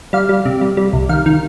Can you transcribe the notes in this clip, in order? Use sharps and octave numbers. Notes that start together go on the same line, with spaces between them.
G3 F5
G3
C3
G3
G3
C2
D#3 F5
D#3